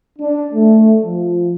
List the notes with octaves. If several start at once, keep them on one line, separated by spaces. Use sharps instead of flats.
D4
A3
F3